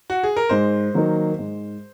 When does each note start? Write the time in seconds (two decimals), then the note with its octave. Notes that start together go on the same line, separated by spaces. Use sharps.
0.10 F#4
0.24 G#4
0.36 A#4
0.49 G#2 C5
0.94 D#3 F#3 A#3
1.39 G#2